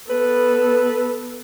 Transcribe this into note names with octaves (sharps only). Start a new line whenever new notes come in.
B3 A4 B4